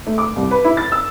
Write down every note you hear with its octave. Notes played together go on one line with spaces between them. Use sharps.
A3
D6
C2
B4
E4
A6
E6